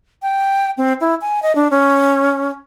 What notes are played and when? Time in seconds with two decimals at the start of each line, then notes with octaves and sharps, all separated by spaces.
0.22 G5
0.78 C4
1.01 E4
1.21 G#5
1.43 D#5
1.55 D4
1.71 C#4